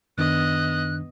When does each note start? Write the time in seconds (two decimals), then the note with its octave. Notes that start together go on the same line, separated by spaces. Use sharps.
0.18 F#2 D#3 B3 D4 D#5 F#6